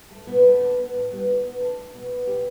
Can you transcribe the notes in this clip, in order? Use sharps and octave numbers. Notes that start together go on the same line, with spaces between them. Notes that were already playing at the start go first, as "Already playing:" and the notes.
A3
B2 B3
A3
D3
B3
A2
G3 B3
D3
B3
D3 D4
A3
B2
B3
B2 G4